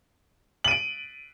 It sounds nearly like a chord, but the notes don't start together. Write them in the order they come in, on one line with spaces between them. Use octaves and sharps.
F#7 D#7 D7